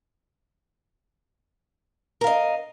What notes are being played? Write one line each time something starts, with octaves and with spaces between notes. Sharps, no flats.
A#4 D#5 F5